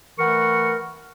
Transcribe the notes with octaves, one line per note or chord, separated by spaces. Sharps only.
E3 A3 A#4 F#5 C#6